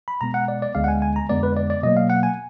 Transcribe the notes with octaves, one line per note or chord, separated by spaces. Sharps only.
B5
B2 G#3 B3 A#5
F#5
D5
D5
D2 D3 G#3 B3 F5
F#5
G#5
G#5
A#5
F2 D3 G#3 B3 D5
B4
D5
D5
B2 F#3 A#3 D#5
F5
F#5
G#5